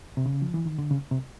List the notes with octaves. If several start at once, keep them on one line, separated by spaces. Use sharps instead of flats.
C3
C#3
F3
E3
D#3
D3
C#3
C3